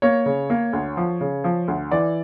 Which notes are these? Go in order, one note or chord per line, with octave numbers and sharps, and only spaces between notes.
A#3 C#5
C#3
A#3
D2
F3
C#3
F3
D2
E3 D5